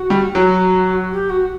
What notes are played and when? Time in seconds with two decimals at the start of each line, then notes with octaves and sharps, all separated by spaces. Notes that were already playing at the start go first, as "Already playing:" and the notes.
Already playing: F#4
0.10 G3
0.35 F#3 F#4
1.11 G4
1.29 F#4